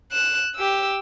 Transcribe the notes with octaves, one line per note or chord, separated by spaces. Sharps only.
F#6 E7
G4 E6